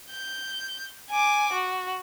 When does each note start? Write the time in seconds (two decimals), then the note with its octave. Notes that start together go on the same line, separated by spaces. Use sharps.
0.11 G6
1.11 G#5 D6
1.52 F#4